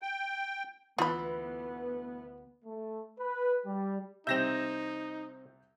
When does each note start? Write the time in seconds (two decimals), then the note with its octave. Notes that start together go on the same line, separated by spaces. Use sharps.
0.02 G5
0.98 D2 E3 B3 F4 B5
2.65 A3
3.19 B4
3.65 G3
4.27 C2 C4 D#4 G4 E5 G6 A#6 E7